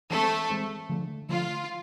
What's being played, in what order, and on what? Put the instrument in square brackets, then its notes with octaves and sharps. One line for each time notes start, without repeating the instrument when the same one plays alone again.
[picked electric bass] E3 G#3 C4 [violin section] A3 A4
[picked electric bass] E3 G#3 C4
D3 F3 A3 D4
[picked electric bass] D3 F3 A3 D4 [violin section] F4